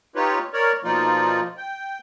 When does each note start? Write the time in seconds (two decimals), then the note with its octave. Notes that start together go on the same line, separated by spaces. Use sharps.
0.15 D#4 F4 G4 B4 C#5
0.53 A#4 C#5 D5
0.84 B2 F3 A#3 D#4 F4 D5
1.57 G5